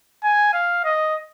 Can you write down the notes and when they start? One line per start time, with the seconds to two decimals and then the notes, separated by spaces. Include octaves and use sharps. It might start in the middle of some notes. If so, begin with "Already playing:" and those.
0.24 G#5
0.53 F5
0.84 D#5